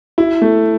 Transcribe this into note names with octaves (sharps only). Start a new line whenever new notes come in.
E4
A3